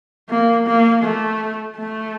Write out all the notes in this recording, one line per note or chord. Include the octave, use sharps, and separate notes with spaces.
A#3
A#3
A3
A3